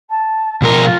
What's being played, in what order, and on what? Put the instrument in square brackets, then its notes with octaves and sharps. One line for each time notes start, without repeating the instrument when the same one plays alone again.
[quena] A5
[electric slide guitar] B2 F3 A#4 [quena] C6
[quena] F4